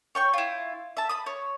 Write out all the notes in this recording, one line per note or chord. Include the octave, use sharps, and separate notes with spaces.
C#5 G5 C#6
E4 F4
E5 A5
B5 D#6
C#5